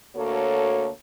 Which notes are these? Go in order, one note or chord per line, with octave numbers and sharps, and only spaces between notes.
D2 A#3 F#4 A4 C#5